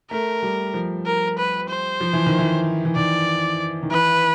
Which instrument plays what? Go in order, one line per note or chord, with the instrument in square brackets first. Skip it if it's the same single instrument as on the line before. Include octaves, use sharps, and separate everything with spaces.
[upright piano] A3 [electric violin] A#4
[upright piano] G3
F3
[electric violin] A#4
B4
C5
[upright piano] F3
E3
D#3
E3
E3
[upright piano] D#3 [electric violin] D5
[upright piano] D#3
[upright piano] E3 [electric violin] B4